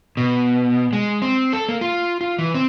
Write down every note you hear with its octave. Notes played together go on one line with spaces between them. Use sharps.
B2
G#3
C4
A4
A#3
F4
F4
E3
C4